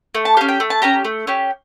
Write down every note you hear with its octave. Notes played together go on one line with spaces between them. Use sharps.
A3
A5
C#4 G4 F5
G5
A3
A5
C#4 G4 A#5
A3
C#4 G4